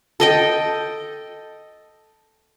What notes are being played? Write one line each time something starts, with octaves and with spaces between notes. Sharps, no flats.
A4 D#5 G5